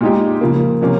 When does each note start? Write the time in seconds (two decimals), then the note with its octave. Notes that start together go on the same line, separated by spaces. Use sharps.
0.01 A#2 G#3 D#4 G4
0.41 C#3 F3 A#3
0.81 C3 F3 A#3 C#4